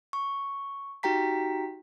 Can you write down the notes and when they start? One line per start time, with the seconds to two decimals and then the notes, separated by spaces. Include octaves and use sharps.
0.13 C#6
1.03 D#4 F#4 G4 G5 A#5 B6